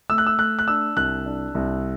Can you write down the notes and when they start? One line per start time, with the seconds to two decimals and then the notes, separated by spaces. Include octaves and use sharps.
0.09 A3 E6
0.18 F#6
0.26 E6
0.38 A3 F#6
0.59 F#6
0.68 D4 E6
0.96 C2 F#6
1.26 D4
1.55 C2